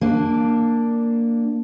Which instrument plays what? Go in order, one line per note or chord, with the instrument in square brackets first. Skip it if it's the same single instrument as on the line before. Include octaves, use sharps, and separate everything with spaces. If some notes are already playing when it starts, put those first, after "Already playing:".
[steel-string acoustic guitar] A#3 D4